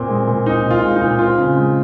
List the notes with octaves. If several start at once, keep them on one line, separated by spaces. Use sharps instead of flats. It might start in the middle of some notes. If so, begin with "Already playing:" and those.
Already playing: A#2 C4
G#3
A#2
C4 D#4
A#2
F4
G#3
D#4
A#2
C4 F4
C#3
G#3